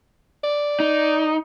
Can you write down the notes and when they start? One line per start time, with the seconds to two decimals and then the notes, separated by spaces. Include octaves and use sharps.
0.44 D5
0.80 D#4